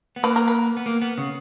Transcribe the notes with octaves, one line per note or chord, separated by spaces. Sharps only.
B3
A#3 B4
A#4
B4
B3
A#3
B3
C#3